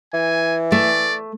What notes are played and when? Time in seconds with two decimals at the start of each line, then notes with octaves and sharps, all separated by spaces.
0.14 E3 G#5
0.72 A3 D5